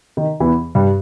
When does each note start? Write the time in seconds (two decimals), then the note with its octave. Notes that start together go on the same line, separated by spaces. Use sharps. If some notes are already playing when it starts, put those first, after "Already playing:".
0.17 D#3
0.40 E2 E3
0.75 G2 G3